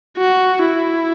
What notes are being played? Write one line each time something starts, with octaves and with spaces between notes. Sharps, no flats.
F#4
E4